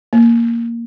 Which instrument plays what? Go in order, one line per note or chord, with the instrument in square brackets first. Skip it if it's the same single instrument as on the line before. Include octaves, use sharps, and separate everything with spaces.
[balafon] A#3